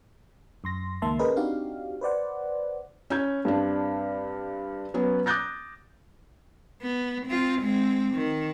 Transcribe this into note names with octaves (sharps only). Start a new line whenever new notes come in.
F#2 C6 A#6
C#2 D#3 A#3 E5 A5 C6
C#4 G#4 A#4 B4 D#5
C4 D4 D#4 F#4 G4 F5
B4 C5 D5 F#5
C#4 E4 G6 G#6
G2 C4 D4
F#3 B3 C#4
D6 D#6 F#6 G6 A6 A#6
B3
C4 F4
G#3 C4
D#3